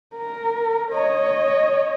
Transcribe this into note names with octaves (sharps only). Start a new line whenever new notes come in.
A#4
C#5 D#5